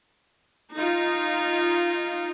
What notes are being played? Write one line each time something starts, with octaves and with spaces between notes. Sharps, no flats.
D#4 F4